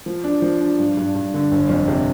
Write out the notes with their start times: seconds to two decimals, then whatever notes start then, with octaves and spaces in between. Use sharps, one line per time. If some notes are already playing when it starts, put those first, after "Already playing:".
0.06 F3
0.24 D4
0.42 F3
0.60 D4
0.79 G2
0.97 G2
1.15 G2
1.34 D3
1.52 G1
1.69 F2
1.88 C3